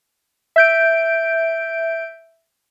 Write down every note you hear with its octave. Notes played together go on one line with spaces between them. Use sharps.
E5 G6 D7